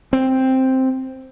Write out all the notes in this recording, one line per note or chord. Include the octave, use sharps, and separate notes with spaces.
C4